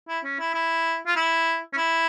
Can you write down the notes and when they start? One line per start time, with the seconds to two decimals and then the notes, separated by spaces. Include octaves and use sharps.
0.08 E4
0.24 C#4
0.40 E4
0.54 E4
1.07 F4
1.16 E4
1.73 C#4
1.77 E4